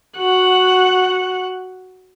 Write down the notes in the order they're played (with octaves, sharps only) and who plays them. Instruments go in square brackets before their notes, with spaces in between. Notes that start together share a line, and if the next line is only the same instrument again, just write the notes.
[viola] F#4 F#5